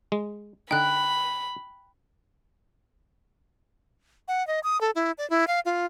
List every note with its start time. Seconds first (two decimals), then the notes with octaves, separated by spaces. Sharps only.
0.12 G#3
0.71 D3 D#4 G5 B5 F#6
4.28 F#5
4.47 D#5
4.64 D#6
4.81 A4
4.95 E4
5.18 D5
5.30 E4
5.47 F5
5.65 F4